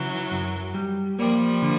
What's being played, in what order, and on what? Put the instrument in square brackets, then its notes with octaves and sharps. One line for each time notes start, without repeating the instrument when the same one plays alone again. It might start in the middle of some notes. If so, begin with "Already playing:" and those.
Already playing: [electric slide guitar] C#3 [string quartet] E3 F#3
[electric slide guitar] F#2
G3
[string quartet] F3 G3 [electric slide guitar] A#3
[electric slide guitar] D3